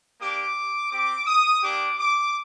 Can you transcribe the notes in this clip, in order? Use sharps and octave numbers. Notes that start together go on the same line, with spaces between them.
A#3 D4 G4 D6
C4 G4 D6
D#6
A#3 D4 G4 D6
D6